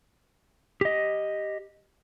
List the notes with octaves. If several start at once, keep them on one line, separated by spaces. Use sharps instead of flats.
G4 D#5